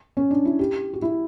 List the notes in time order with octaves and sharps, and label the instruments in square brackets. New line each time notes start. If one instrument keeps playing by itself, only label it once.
[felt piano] C#4
D4
E4
G4
F#4
E4